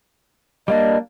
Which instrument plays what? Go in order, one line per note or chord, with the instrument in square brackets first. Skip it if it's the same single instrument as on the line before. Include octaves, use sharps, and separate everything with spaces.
[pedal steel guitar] G3 A#3 D4 [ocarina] D#5